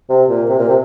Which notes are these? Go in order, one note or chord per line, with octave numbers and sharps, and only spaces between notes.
C3
A#2
C3
A#2
C3